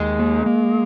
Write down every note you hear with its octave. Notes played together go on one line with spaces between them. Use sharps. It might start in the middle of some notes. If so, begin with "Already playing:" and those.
Already playing: D#2 G#3
A#3
A#3